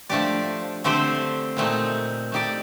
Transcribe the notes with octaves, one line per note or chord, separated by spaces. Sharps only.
F3 A3 D4 G4 D5
D3 A3 C4 G4 C5
A#2 A3 C4 D#4
A3 D#4 G4 D5